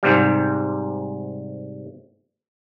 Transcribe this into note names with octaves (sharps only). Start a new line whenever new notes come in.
G#2 C3 G3